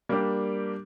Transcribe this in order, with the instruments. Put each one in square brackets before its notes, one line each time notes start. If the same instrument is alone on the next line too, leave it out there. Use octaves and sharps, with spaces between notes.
[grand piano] G3 A#3 D4 G4